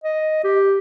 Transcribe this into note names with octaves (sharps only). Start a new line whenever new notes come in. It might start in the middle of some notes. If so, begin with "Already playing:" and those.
D#5
G4